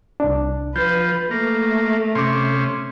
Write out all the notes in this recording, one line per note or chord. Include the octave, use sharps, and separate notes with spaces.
C2 D4
F3 B4 G6
A3 A#3
C3 C#4 C6 D6